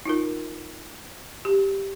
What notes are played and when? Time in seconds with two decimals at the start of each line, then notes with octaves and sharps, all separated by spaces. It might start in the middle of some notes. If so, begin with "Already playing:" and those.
0.05 D#4 F4 A#4
1.45 G4